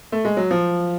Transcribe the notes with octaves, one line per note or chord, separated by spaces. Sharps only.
A3
G#3
F#3
F3